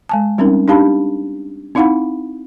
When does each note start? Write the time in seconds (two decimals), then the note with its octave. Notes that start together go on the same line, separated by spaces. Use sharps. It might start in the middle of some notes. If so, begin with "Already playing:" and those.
0.09 G#3 G#5 A5
0.38 G3 C4 C#4 D#4 A#4
0.68 D4 D#4 G4 F5 A5 B5
1.75 C4 D#4 E4 F5 F#5 B5